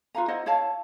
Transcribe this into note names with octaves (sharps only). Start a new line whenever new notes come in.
F4 B4 F5 A#5
E4 C5 D#5 F#5
E4 C#5 F5 A5